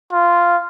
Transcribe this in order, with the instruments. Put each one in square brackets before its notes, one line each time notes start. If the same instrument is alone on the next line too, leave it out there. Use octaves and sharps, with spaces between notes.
[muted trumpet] F4